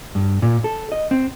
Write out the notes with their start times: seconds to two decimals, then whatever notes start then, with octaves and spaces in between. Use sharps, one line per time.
0.15 G2
0.42 A#2
0.64 A4
0.92 D#5
1.11 C4